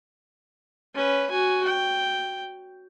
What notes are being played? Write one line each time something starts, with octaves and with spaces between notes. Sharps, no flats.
C#4 B4
F#4 G#5
G5